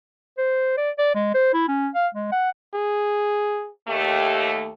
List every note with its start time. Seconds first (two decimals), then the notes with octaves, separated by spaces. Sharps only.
0.38 C5
0.77 D5
0.98 D5
1.15 G#3
1.34 C5
1.53 E4
1.68 C#4
1.95 F5
2.14 G#3
2.32 F#5
2.74 G#4
3.88 D#2 A3 G4